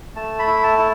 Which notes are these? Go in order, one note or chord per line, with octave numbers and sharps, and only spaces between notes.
A3 A5
B5
E4
A5
E4